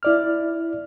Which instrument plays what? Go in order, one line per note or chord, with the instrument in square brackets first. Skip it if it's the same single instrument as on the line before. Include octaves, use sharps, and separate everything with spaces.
[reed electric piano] E4 D5 F6